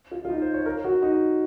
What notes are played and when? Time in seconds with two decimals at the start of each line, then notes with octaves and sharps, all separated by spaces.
0.11 F4
0.25 F4
0.30 D#4
0.42 C5
0.54 C#5
0.66 A#4
0.85 F#4
1.02 D#4